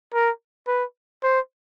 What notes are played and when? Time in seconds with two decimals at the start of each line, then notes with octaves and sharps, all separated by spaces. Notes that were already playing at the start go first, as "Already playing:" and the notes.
0.14 A#4
0.68 B4
1.23 C5